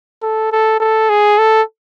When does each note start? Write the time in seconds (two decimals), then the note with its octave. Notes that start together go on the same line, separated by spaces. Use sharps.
0.22 A4
0.52 A4
0.80 A4
1.09 G#4
1.38 A4